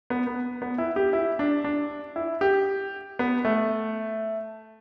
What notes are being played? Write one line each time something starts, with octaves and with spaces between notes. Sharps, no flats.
B3
B3
B3
E4
G4
E4
D4
D4
E4
G4
B3
A3